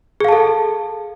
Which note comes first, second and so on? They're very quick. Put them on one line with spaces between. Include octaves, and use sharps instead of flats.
G#4 F5 A5 A4